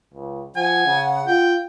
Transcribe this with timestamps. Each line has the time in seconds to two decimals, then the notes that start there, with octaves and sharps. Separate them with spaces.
0.14 C#2
0.56 F3 F#5 G#5
0.87 C#3
1.27 F4 G5